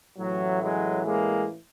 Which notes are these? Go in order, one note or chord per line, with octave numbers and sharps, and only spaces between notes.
A1 A2 E3 F#3
F#3 G#3
G#3 A#3